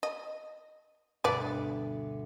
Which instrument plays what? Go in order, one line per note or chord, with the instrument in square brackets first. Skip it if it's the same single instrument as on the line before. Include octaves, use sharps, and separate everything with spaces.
[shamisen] D#5
[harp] D2 G2 B2 [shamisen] B4 D5